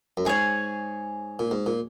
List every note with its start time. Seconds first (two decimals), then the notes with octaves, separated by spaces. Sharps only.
0.17 F#2
0.25 G#2 G#4 C#5 G#5
1.39 A#2
1.51 G#2
1.66 A#2